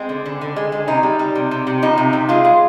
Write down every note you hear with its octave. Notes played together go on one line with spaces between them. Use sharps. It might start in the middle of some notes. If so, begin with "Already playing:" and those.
Already playing: G#3 C4
D3
D3
D3
G#3
G#3
C3 D#4
G3
G3
C3
C3
C3
F3 D#4
C3
C3
G#3 F4
G#3